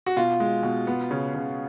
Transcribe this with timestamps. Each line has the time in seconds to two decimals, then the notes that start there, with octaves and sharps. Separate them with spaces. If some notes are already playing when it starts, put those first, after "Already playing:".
0.06 F#4
0.17 B2 F4
0.40 G#3
0.63 B2
0.87 B3
1.11 C#3
1.34 C#3